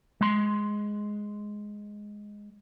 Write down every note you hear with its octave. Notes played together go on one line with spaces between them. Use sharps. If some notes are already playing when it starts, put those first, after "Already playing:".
G#3 C6